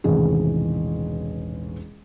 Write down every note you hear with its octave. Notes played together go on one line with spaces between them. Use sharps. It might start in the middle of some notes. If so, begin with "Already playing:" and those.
E1 A1 C3 D#3 G#4